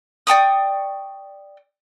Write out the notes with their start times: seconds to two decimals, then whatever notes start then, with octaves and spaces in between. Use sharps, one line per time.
0.27 D5 G5 C#6 D#6